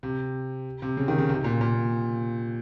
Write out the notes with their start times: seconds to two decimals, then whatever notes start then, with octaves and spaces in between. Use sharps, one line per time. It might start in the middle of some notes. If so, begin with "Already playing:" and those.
0.03 C3
0.82 C3
0.97 C#3
1.08 D#3
1.18 C#3
1.29 C3
1.44 A#2
1.61 A#2